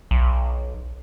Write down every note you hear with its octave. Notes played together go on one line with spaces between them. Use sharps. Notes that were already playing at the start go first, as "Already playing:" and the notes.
B1